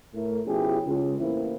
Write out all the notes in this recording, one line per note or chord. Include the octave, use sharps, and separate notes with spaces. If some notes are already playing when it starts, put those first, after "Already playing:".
A2 A3 A#4
B2 F3 C#4 E4 G4 G#4
C#2
A1 E3 A#3 C4 E4